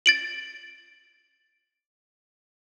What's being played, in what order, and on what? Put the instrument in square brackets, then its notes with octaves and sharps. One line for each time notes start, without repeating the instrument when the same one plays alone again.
[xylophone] A6 D7 F#7